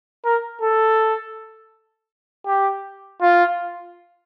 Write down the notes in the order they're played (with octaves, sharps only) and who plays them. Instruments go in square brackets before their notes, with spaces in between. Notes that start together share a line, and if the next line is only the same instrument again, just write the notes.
[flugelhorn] A#4
A4
G4
F4